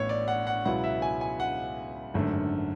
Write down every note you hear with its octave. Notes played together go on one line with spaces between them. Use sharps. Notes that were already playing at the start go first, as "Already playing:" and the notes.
Already playing: A1 A2 E3 B3 C#5
D5
F#5
F#5
C#2 B2 F#3 B3 E4 F#5
E5
G#5
G#5
F#5
G#1 F#2 D3 A3